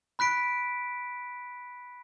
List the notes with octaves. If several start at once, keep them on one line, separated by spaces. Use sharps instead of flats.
B5 F#6 B6 D7